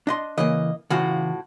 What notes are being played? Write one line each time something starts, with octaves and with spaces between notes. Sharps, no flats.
D4 D#5 C6
C#3 E3 A#3 D#5
A2 C#3 E3 F4 F#4